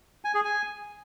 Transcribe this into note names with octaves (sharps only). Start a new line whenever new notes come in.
G#5
G#4
G#5